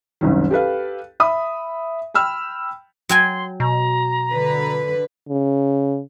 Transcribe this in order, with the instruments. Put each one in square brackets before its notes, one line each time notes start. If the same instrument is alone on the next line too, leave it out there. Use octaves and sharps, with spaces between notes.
[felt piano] F#1 C2 D#3
G4 A4 B4 F5
E5 B5 D#6
G5 B5 E6 F6
[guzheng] F#3 G5 G#5 [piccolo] C6
[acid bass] B2 [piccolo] A#5
[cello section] D3 B4
[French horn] C#3